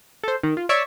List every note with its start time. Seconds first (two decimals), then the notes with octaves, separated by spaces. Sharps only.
0.23 A4 C5
0.43 D#3
0.57 F4
0.69 C#5 D5 E5 C#6